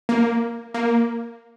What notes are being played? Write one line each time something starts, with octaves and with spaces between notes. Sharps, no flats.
A#3
A#3